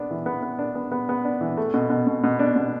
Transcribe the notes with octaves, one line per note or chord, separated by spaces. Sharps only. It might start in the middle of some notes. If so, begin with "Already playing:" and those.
Already playing: B3 D4
E3
B3
B3
D4
B3
B3
B3
D4
E3
A3
B2
B2
B2
B2
D4
B2